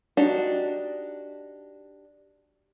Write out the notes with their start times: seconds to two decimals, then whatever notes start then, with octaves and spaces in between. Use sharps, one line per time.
0.17 D4 D#4 F#4 G4